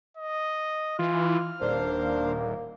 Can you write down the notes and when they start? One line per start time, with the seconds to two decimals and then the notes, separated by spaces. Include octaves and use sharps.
0.17 D#5
0.99 E3 F4 F6
1.61 D#1 A#3 D4 C5 F5